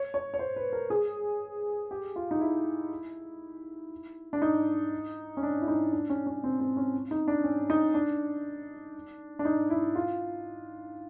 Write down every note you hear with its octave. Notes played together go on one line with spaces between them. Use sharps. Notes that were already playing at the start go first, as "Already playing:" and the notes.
Already playing: C#5
C#5
C#5
C5
B4
A#4
G#4
G4
F4
D#4
E4
D4
D#4
C#4
D4
E4
D#4
D4
C#4
C#4
C4
C4
C#4
D#4
D4
C#4
D#4
D4
D4
D#4
E4
F4